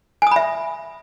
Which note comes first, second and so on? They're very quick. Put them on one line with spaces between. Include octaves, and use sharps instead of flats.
G#5 D#6 B5 E5